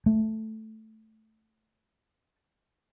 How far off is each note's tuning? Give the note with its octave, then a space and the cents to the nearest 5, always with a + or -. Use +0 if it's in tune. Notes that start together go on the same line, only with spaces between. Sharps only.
A3 +0